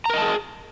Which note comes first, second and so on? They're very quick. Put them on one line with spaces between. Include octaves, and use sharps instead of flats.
A#5 A#4 D#5 A5 G#4